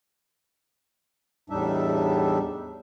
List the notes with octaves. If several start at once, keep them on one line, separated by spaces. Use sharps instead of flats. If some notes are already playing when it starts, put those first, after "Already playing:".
E2 A2 G3 D4 D#4 E5